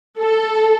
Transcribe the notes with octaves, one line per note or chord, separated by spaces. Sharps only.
A4